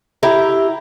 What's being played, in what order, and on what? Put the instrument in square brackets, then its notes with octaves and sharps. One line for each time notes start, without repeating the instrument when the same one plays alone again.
[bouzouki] E4 G4 A#5